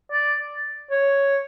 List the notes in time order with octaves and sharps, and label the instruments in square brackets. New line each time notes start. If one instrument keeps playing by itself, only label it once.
[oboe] D5
C#5